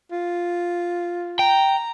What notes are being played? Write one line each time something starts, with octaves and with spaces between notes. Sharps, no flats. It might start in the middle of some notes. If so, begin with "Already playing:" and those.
F4
G5 A#5